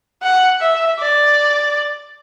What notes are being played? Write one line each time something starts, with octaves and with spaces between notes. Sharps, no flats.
F#5
E5
D5